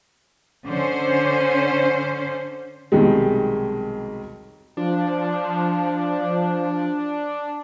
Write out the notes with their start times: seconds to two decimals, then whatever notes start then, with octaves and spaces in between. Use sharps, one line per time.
0.69 D3 C#4 C5
2.92 B1 C3 D#3 G3 G#3
4.77 F3 D4